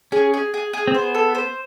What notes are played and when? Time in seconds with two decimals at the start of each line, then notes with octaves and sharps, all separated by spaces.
0.12 C#4 G#4
0.34 G#4
0.54 G#4
0.73 G#4
0.88 C4
0.94 B3 C5
1.14 A4
1.35 C5